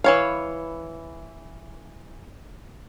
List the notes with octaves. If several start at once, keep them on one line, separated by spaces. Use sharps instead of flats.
E3 C#5 F5